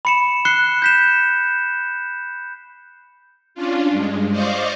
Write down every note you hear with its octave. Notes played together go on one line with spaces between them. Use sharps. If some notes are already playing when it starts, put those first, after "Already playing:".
B5 C#7 E7
F#6 C7 C#7 G7
G6 B6 E7
C#4 D4 F4
G2 G#3
C5 D5 D#5 F5 C#6 D6